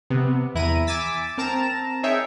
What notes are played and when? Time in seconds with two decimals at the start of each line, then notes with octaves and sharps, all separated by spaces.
0.10 C3 B3
0.55 E2 E4 A#5 D#7
0.87 G#5 D6 E6 A6 B6
1.38 C4 A#4 A5 A#5 E7
2.03 D#4 G#4 C#5 E5 G5